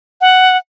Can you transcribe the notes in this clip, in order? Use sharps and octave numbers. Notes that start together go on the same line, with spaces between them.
F#5